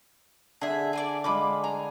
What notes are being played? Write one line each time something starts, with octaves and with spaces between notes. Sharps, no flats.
D3 G#4 E5
G#4 B4 D5
D3 G#3 F4 B5 D6
G#5 A#5